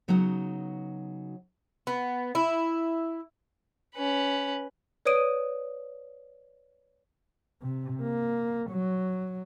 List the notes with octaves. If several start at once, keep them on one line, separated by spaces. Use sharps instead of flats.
C#3 F#3 B3 D#4 F#4 F#5
B3
E4
C#4 B4
B4 C#5 D5 D#6 D7 D#7
C3
A#3
F#3